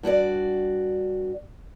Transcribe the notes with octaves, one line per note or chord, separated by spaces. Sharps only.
G2 F#4 G4 D5